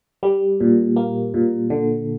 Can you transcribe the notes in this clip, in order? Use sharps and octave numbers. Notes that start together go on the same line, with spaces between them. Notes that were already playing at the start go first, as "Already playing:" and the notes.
G3
A#2
A#3
A#2
D3